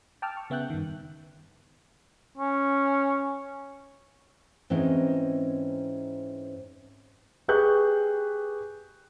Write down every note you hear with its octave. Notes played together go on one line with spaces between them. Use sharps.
G5 A5 D6 E6 F6
C#6
C#3 B3 E5 G5 F#6 G6
G2 D#3
C#4
G#2 E3 C4 C#4 D#5
G4 G#4 B4 C#6 F#6 G6